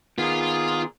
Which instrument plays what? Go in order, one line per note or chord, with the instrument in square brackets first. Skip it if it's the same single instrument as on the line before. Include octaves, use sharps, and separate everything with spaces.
[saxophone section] A#2 G#4 [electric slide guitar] D#3 B3 [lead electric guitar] F4